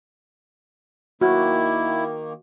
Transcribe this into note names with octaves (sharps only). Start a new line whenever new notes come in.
D#3 A#3 E4 F#4